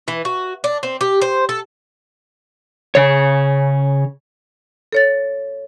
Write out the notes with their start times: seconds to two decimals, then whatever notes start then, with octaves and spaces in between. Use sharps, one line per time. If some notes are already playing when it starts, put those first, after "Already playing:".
0.08 E3
0.25 F#4
0.64 D4
0.83 C4
1.01 G4
1.22 C5
1.49 A4
2.95 C#3 C#5
4.92 A4 C#5 A6